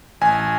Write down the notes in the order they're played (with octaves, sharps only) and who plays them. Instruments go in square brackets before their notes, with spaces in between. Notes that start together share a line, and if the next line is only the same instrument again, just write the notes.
[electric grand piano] A1 G#5